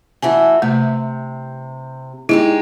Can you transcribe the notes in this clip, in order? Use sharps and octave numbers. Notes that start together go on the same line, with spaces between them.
E3 A3 F#4 G#5
C3 A3
G#3 D#4 E4 G4